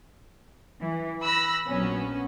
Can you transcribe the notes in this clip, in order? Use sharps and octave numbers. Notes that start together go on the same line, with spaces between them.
E3
B5 E6 F#6 A#6
A#1 F#3 B3 C#4